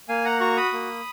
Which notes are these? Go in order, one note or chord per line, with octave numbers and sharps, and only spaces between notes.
A#3 F5 G#5
F#5 A#5
F#4 A#5 C#6
B5 D#6
A#3